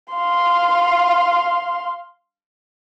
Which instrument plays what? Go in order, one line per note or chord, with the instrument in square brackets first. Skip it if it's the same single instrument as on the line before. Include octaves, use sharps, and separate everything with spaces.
[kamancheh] F5 C6